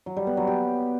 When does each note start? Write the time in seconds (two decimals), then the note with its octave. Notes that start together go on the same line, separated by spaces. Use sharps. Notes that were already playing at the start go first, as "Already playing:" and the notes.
0.06 F#3
0.17 G3
0.27 B3
0.37 F#3
0.47 G4